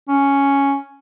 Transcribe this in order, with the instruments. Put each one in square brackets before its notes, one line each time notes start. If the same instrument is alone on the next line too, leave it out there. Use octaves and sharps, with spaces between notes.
[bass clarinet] C#4